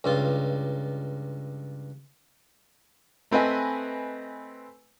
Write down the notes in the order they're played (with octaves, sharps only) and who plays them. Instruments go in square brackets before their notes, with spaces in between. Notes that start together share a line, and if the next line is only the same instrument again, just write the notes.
[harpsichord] C#2 G2 F4
[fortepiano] A3 C4 B4 D#5 G#5